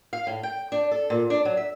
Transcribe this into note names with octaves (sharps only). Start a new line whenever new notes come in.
F5
A2
G5
D4
A4
A#2
D4
F#3
E5